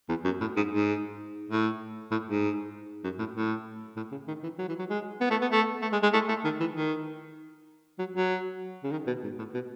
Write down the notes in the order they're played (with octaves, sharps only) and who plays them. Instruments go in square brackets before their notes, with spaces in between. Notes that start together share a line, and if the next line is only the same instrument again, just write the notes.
[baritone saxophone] E2
F#2
A2
G#2
G#2
A2
A2
G#2
F#2
A2
A2
A2
C#3
D#3
E3
F#3
E3
F#3
G#3
B3
A3
B3
A3
A3
G#3
G#3
A3
A3
D#3
E3
D#3
F#3
F#3
C#3
D#3
B2
G#2
A2
B2